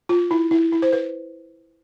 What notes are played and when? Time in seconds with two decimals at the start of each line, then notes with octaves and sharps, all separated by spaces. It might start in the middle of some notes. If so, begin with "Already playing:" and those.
0.09 F4
0.31 E4
0.51 E4
0.72 E4
0.82 C5
0.93 B4